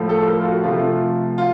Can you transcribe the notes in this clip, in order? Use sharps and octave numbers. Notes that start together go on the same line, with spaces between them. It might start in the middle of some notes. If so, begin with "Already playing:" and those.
Already playing: A2 F3 A3
A4
A#4
F4
F#4
C3 F3 A3 F4
F4